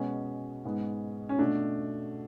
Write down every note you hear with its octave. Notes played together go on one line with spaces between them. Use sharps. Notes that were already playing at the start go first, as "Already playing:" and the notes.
Already playing: B2 G#3 B3 C#4
G#2 G#3 B3
C#4
B2 A3 D4